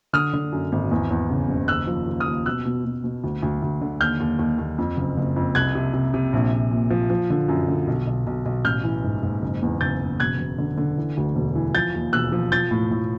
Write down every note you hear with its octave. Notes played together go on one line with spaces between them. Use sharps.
D3 D#6 F6
D3
F#2
G#1
E2
E2
C#3
F#1
D#2 E6 F#6
F3
D#2
D#6 F6
D#2
B2 E6 F#6
B2
B2
B2
D2
D2
D2
D3
D#2 F6 G6
D#2
D#2
D#2
F2
F#1
F#1
F2
C2 F#6 G#6
C3
C3
C3
A#1
A#1
A#2
F3
F3
D3
F#2
D3
B1
B1
B1
B1
A1 F6 G6
E3
G#2
G#2
F#1
E2
F#1 G6 A6
F#1
E1 F#6 G#6
E1
D3
D3
E3
D2
E1
E3
F3 G6 A6
D#2
E1 E6 F#6
F3
F3 G6 A6
A2
A2